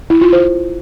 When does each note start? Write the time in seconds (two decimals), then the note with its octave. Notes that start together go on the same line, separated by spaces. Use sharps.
0.10 E4
0.21 F4
0.33 C5